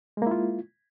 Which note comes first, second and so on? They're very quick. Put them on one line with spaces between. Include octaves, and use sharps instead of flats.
G#3 A#3 E4 F4